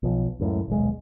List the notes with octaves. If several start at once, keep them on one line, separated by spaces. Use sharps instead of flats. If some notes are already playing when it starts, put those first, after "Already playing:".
B1 F3
C#2 F#2 A2
D#1 B1 G#3